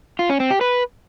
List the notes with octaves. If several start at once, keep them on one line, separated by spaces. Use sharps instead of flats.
F4
C#4
C4
G4
B4